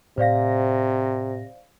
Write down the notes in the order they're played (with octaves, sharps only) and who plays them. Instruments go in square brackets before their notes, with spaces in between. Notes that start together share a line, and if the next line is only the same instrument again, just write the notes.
[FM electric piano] A2 A#6 [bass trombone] C3 [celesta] C5 D5 F5